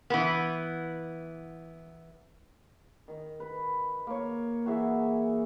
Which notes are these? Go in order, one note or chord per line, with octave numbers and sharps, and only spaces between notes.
E3 B3
D#3
B4
A#3 C#5
E3 F#4 G#4 E5